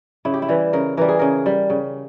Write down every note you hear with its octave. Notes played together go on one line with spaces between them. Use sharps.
C#3 E4
G4
E4
E3 G3
C#3 A#4
E3 G3 A#4
G#4
C#3 A#4
G3
C#3